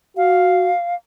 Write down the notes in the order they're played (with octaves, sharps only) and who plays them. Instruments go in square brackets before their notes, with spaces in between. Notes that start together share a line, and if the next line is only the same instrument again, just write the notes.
[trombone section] F#4 [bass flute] F5